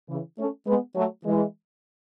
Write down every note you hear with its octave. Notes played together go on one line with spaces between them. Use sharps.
C#3 E3
A3 C#4
G#3 B3
F#3 A3
E3 G#3